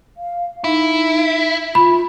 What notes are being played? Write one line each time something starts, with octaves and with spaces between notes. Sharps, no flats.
F5
D#4 E4
F4 B5